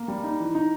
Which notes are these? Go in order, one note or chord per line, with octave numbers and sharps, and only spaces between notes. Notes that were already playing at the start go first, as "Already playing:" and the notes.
Already playing: A#3
G3
D#4
E3
D#4